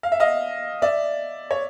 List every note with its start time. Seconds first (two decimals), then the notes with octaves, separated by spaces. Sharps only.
0.03 F5
0.12 E5
0.20 D#5 F5
0.82 D5 E5
1.51 C#5